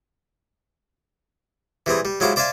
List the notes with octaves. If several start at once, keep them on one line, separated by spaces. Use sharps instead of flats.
E3 G3 C4 G#4
G3
F#3 G#3 E4 F4 G4 C5
C5 D5 E5 F5 G#5 A5